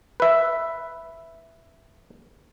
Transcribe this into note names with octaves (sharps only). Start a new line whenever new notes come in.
B4 E5